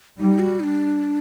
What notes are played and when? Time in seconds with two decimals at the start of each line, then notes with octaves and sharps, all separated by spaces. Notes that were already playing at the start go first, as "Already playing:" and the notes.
0.19 G3 D#4
0.39 F#4
0.60 D#4
0.63 D4